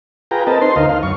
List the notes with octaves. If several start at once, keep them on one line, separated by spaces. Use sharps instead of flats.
F4 G#4 B4 G5 A#5
C4 A#4 B4 D#5 A5
D#4 C5 C6
D2 D#4 A#4 D#5 F5
F5
F#2 C#6